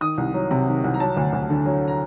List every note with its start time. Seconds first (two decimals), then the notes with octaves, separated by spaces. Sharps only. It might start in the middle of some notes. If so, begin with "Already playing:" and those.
0.01 D#3 D#6
0.18 C2
0.34 F#3
0.51 C3
0.68 D#3
0.84 C2
0.94 A#5
1.00 F#3 A5
1.17 D2
1.33 D2
1.50 D3
1.66 F#3
1.88 A#5